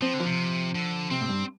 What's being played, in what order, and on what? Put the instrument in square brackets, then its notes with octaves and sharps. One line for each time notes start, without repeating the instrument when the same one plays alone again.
[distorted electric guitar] F3 [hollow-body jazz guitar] C4
[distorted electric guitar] D3
[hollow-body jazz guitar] F3
[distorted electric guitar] C3
D3
[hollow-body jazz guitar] C3 [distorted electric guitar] C4
[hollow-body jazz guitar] A2
G2